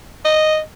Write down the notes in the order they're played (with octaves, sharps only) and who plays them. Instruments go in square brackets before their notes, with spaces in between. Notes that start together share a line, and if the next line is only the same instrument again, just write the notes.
[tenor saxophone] D#5